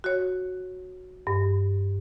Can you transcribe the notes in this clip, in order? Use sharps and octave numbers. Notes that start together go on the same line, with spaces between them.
F#4 C#5
G2